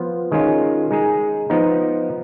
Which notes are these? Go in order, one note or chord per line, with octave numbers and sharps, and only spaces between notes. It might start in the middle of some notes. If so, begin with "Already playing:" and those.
Already playing: F3 B3 F4
D#3 G#3 C#4 F4
G#3 D#4 G#4
F3 B3 D#4